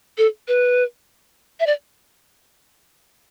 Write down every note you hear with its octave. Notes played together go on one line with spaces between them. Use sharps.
A4
B4
E5
D5